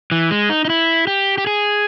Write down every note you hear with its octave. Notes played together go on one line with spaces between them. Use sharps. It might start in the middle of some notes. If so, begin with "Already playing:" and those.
E3
G#3
D#4
D#4
E4
G4
G4
G#4